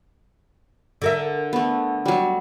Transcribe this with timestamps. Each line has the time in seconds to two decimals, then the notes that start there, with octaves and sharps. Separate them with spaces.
1.02 D3 A#4 E5
1.53 A3 B3
2.06 F#3 G3